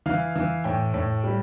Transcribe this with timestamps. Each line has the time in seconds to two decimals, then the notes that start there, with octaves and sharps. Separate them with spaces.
0.06 E3 F5
0.36 E3
0.64 A2 G5
0.94 A2
1.24 G3